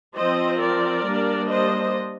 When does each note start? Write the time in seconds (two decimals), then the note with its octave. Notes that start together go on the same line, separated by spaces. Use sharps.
0.17 F3 C4 C5 D#5
0.61 A#4 D5
1.05 G3 A#3 D4
1.49 C5 D#5